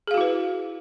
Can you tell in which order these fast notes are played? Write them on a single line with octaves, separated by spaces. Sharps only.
G#4 F5 F#4 E4 B4